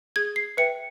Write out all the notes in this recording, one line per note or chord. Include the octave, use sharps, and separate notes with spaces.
G#4 G#6
C7
B4 E5 G5 C#7